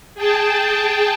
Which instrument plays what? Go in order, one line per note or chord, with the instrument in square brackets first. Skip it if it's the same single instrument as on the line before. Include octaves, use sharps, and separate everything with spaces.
[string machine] G#4 G5 A5